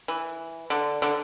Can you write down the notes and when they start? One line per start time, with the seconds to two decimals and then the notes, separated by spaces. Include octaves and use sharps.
0.08 E3
0.70 D3
1.02 D3